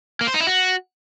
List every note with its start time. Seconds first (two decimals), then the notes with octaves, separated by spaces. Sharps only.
0.21 A#3
0.27 C5
0.34 D#4
0.40 E4
0.47 F#4